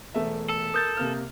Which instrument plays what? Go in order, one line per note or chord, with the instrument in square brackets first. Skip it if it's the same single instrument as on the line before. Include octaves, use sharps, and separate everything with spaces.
[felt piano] E1 A3 E5
[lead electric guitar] A4
[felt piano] A#4 [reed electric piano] D#6 G6 A6
[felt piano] C3 A#3 F6